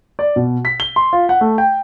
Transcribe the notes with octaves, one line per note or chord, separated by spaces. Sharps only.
D5
B2
B6
G7
C6
F4
F#5
A3
G5